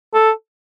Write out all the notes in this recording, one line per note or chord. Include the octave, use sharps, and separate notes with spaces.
A4